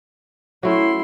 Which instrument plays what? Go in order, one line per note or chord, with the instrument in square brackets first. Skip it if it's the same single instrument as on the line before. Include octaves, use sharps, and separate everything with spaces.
[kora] F#3 A3 C#4 [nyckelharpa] E4 C6